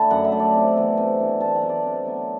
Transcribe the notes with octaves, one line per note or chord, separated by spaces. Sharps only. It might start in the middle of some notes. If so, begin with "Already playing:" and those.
Already playing: D3 A3 D4 A5 B5
F#2 F#5
E5
D3 A3 D4
D5
C3
E3 B3 D4
C3
E3 B3 D4
C3 A5
F#5
F#3 B3 D4
D5
C3
F#3 B3 D4